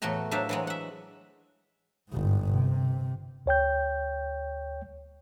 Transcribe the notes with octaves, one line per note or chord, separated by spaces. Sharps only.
E2 A2 A3 F#4 A#5
F#3 D4 C5 E5 F5
E3 F#3 G#3
E5 F#5
G1 G#2
C3
D2 C#5 G5 G6